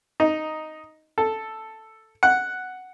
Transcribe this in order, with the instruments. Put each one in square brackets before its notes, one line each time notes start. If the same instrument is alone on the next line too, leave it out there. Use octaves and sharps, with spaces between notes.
[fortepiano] D#4
A4
F#5